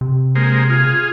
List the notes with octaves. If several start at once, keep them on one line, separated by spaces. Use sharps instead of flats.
C3
G#3 A#3 C5
F4 G#4